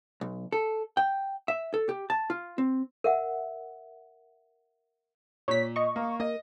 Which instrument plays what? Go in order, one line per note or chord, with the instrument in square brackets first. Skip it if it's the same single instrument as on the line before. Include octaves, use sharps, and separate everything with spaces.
[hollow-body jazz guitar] B1
A4
G5
E5
A4
G4
A5
F4
C4
[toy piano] A#4 E5 F#5
[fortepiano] A#2 [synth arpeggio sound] C#5 B6
[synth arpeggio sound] D#5 C#6
[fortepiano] A#3
[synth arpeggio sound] A#3 [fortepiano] D#5